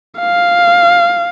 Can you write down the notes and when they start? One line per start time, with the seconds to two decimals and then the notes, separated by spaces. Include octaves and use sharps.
0.19 F5